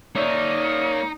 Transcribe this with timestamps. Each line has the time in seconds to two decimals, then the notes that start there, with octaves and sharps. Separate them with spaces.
0.15 A#3 D#4 C#5 D5 E5